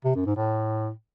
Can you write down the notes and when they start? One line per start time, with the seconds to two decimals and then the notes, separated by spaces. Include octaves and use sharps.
0.05 C3
0.15 F#2
0.26 G#2
0.36 A2